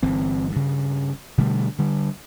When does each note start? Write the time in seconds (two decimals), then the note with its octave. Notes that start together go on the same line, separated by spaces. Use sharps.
0.03 G1 E3 C4
0.52 G2 C#3
1.38 B2 D3 G3 A3
1.79 D3 G3